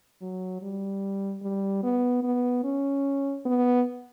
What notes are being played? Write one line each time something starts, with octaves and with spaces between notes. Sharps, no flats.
F#3
G3
G3
B3
B3
C#4
B3